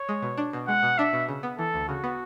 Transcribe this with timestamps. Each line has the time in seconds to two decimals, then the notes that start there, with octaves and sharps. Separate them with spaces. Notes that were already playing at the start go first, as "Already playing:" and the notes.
Already playing: C#5
0.09 G#3
0.22 B2
0.38 D4
0.53 B2
0.68 G#3 F#5
0.83 B2
0.99 D4 E5
1.13 B2
1.29 C#3
1.43 B3
1.58 E3 A4
1.74 D2
1.88 C#3 F#4
2.04 B3